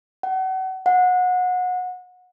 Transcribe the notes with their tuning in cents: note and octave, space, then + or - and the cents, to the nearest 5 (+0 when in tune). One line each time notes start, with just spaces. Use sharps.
F#5 +35
F#5 -25